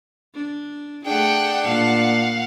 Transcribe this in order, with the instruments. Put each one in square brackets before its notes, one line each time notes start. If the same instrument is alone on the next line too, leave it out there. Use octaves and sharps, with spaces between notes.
[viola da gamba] D4
[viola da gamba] A3 G#4 [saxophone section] D4 [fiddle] F#5 G5
[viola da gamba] A#2 [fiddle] F5 F#5